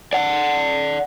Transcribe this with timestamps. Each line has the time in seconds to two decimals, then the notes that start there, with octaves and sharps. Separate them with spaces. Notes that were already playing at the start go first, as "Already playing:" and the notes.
0.13 D5 F#5